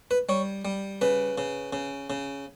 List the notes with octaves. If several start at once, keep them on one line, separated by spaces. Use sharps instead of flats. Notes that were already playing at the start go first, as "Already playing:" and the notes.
B4
G3 C#5
G3
C#3 B4
C#3
C#3
C#3